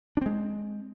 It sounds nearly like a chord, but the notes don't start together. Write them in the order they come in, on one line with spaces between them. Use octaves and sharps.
D4 C4 G#3